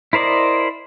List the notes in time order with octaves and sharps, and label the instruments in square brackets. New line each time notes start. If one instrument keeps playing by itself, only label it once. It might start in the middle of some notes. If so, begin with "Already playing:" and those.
[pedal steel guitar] E4 A#4 C5 D5 D#5